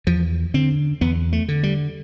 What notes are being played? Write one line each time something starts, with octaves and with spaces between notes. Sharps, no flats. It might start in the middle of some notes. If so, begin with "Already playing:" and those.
E2 F3
D3 C4
E2 B3
A3
D3
G3